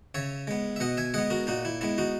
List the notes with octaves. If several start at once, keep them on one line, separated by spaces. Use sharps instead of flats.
C#3 C#5 E5
G#3 B3
E5
B2 D#5 F#5
E5 G#5
G#3 B3 D#5 F#5
F#4 A#4
A#2 D#4 F#4
E4
G#3 B3 E4
D#4 F#4